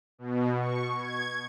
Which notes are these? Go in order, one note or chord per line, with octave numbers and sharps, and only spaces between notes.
B2
C#6
G#6